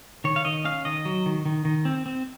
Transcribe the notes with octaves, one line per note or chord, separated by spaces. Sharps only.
D#3 C#5
F5
D#3 D#5
C#4 F5
D#3 D#5
F#3
D#3
D#3
D#3
C4
C4